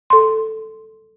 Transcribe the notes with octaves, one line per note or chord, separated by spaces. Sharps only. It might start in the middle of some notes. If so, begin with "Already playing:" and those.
A4 C6